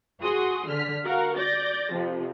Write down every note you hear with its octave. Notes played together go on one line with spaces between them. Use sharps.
F#4 G#4 C6 C#6 D#6
D3 F6 B6
F#4 A#4 F5 F#5
D5 G6 A6 A#6
F2 C3 F3